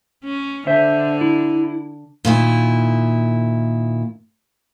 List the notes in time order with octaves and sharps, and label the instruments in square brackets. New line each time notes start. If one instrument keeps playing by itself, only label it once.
[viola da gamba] C#4
[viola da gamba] D3 [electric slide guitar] C5 E5
[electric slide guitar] E4
[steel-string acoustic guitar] A#2 D#3 E4